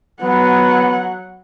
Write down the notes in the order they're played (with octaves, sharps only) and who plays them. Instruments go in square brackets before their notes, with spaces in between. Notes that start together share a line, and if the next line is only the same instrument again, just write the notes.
[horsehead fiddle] F#3 F#5 [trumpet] B3